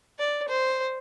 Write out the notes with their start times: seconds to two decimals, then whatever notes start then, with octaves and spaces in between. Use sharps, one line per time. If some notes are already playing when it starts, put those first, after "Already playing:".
0.19 D5
0.48 C5